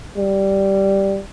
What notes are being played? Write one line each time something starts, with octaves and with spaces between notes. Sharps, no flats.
G3